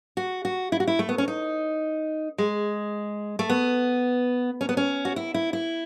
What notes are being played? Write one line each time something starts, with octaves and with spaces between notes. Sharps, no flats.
F#4
F#4
E4
F#4
E4
A3
B3
C#4
D#4
G#3
A3
B3
C#4
B3
C#4
F#4
E4
E4
E4